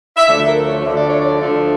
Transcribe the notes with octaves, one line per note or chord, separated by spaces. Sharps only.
E5
D2 D3 F3 A3 D4 D5
A#4
C#5
D2 D3 F3 A3 D4 E5
D5
C#5
D5
D2 D3 F3 A3 D4